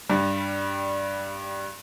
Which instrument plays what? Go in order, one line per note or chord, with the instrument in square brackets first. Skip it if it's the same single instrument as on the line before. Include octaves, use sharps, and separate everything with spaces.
[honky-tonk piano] G2 G3